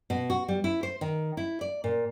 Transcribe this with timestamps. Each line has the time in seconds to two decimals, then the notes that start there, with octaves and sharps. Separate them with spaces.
0.10 B2
0.30 F#4
0.48 G3
0.64 E4
0.83 C5
1.01 D#3
1.37 E4
1.61 D5
1.84 A#2